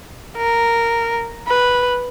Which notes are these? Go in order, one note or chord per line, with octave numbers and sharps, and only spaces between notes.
A#4
B4